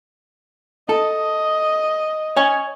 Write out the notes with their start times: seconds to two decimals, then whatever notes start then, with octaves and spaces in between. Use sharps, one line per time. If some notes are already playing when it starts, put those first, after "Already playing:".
0.89 A4 D#5
2.37 C#5 G#5